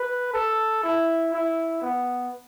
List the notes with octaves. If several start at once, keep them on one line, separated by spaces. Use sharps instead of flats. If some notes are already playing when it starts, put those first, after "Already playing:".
Already playing: B4
A4
E4
E4
B3